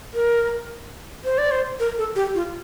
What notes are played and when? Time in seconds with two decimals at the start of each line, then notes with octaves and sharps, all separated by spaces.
0.14 A#4
1.25 C5
1.38 D5
1.51 C5
1.80 A#4
1.98 A4
2.16 G4
2.35 F4